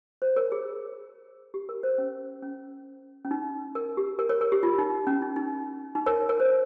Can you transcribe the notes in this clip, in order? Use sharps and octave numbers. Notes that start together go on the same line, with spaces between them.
C5
A#4 C#5
G#4
G4
A#4
C5
C#4
C#4
C#4
D#4
A#4
G4
A#4
A#4 C#5
A#4
G4
F4
D#4
C#4
D#4
D#4
D#4
A#4 C#5
A#4 C#5
C5